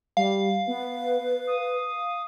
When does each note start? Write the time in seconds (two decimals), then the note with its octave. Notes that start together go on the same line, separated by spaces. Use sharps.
0.17 G3 F5
0.68 B3 B4
1.47 D#6